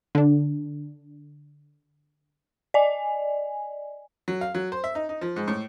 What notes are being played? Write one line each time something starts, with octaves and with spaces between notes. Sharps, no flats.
D3 D4
D5 D#5 G#5
F#3
F5
F#3
C5
E5
D#4
D#4
F3
G#2
A2